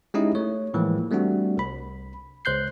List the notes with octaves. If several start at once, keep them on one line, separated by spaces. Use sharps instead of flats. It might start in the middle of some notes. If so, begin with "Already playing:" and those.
G#3 C#4 D#4 E4 G4 D#5
A3 C#5
A2 E3 F3 G#3 A#3
G3 A3 C4 D4 F#4
C2 B5
C#2 C5 F#6 G6 C7